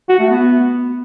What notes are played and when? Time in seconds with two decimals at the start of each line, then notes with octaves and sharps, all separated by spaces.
0.09 F#4
0.20 A3
0.30 B3